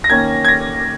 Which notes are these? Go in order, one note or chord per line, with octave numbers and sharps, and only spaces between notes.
A#6
D#3 A#3 C#4 G#6
G#6
A#6